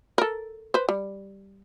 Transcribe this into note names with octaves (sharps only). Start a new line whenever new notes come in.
A4 A#4
B4 C5
G3